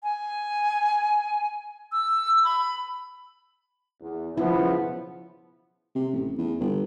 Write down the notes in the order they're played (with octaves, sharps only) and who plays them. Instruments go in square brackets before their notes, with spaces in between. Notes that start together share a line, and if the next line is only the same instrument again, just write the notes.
[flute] G#5
E6
B5
[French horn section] E2
[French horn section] C#3 B3 [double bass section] F3 [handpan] E4
[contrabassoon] C3
A1
E2
G1